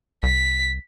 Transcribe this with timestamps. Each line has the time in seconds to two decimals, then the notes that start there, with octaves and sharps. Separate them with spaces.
0.23 C2 B6